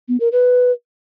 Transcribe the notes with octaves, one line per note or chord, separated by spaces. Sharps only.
B3
A#4
B4